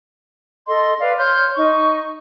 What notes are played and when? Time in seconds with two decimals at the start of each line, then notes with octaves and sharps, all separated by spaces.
0.67 A4 D#5 C6
1.00 B4 D5 F5
1.18 C#5 C6 F6 G6
1.56 D#4 C#6